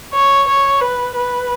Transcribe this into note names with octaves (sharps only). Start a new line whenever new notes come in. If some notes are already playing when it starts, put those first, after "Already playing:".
C#5
C#5
B4
B4